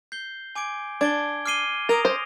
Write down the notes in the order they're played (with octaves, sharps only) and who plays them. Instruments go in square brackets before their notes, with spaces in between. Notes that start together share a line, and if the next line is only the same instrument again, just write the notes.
[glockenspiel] G6 C7 G7
G#5 D6 G#6 D7
[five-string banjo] D4 [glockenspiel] D6 G#6 D7 G7
[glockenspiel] D6 F6 C7 D#7 G7
[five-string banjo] A#4 [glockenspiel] D#6 A#6 D7 F7
[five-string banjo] C5